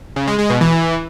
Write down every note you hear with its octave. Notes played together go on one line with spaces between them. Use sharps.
C#3
G#3
G#3
B2
E3